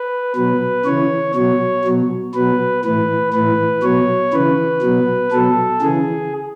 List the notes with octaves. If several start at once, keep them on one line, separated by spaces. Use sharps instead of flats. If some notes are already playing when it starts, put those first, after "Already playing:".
Already playing: B4
B2 F#3 B4
C#3 E3 C#5
B2 F#3 C#5
B2 F#3
B2 F#3 B4
A2 E3 B4
A2 E3 B4
B2 F#3 C#5
C#3 E3 B4
B2 F#3
B2 F#3 A4
C#3 E3 G#4